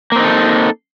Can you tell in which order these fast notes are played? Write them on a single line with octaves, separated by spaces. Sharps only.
A#3 C4 D#4 A4